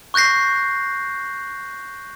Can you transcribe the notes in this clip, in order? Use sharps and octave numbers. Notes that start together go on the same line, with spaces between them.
C#6 F#6 G6 A#6 C7